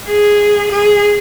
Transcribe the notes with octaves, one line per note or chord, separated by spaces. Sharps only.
G#4
G#4